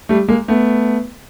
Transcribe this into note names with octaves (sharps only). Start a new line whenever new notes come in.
G3 A3
G#3 A#3
A3 B3